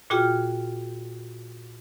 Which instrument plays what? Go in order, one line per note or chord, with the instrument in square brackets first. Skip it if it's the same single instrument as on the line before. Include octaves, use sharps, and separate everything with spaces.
[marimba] A#2 F4 F#4 G#4 G5 F6